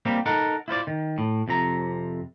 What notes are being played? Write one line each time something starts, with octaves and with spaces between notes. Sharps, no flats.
G3 A#3 C4 G4
D#4 A4 A#4 F#5
E4 F4 C5 D5
D#3
A2
F2 C3 A#5